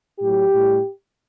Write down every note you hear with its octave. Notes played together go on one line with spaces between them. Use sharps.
A2 F#3 G4
A2 G3